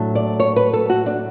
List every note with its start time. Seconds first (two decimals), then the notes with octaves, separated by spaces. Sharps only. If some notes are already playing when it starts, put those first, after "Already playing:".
Already playing: A2 F#3 A3 D4
0.15 D5
0.40 C#5
0.56 B4
0.73 A4
0.89 F#4
1.06 D4